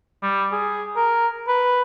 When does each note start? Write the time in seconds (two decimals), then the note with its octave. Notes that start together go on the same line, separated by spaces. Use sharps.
0.23 G3
0.52 G#4
0.96 A#4
1.48 B4